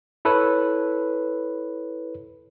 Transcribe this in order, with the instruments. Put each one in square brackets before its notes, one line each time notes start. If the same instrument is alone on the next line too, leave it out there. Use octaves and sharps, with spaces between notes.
[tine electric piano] E4 A4 B4 C#5